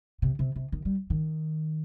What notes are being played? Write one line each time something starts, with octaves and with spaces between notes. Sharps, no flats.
C3
C3
C3
D#3
G3
D#3